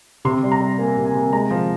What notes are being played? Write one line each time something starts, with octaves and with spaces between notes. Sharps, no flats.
C3 C6
G3
A#5
G3
A#3 G#5
C3
G#5
C3
G#3 A#5
F3